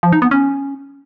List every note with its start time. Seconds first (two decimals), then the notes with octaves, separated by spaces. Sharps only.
0.03 F3
0.12 D#4
0.22 B3
0.31 C#4